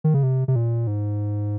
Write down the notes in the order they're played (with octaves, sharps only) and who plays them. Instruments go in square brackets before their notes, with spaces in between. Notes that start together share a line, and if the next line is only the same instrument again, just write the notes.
[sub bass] D#3
C#3
C3
C3
A#2
G#2